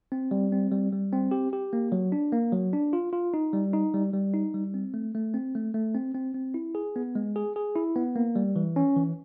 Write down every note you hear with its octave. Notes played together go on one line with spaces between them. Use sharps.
C4
G3
C4
G3
G3
C4
G4
G4
A#3
F#3
D4
A#3
F#3
D4
F4
F4
D#4
G3
D#4
G3
G3
D#4
G3
C4
A3
A3
C4
A3
A3
C4
C4
C4
E4
G#4
B3
G#3
G#4
G#4
E4
B3
A#3
G3
E3
C#4
E3